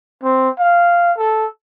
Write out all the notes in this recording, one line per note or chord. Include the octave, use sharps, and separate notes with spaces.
C4
F5
A4